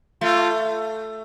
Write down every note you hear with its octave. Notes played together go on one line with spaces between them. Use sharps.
A3 F4